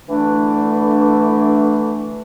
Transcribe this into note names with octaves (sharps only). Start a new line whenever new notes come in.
D3 E3 A3 D4